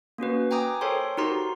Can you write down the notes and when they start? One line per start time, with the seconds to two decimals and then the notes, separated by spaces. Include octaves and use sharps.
0.18 A#3 C#4 F#4 B4
0.51 G5 G#5 A#5 D6 D#6
0.81 A4 A#4 C5 C#5 G5 C6
1.17 D#4 F#4 G4 A#4 A#5 C6